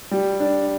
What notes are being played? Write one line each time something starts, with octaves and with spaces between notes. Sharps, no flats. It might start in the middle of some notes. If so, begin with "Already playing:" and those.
G3
D4